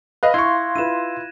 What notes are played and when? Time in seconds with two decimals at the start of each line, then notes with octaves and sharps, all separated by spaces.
0.23 B4 D#5 F5 F#6 A#6
0.34 E4 F5 C6 C#6 G#6
0.76 E4 F4 B4 D#7 E7